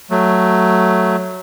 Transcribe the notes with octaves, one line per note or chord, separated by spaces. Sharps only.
F#3 A3